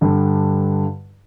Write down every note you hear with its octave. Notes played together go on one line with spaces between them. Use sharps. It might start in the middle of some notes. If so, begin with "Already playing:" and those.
G2 D3